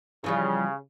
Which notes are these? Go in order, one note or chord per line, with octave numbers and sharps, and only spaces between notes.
C#3 E3 F3 G3